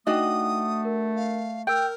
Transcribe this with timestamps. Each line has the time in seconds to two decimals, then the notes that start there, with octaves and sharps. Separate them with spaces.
0.07 A3 D4 D#4 F#4 D#5 G5 D#6
0.85 A#4
1.16 F5
1.67 A#4 G5 E6 G6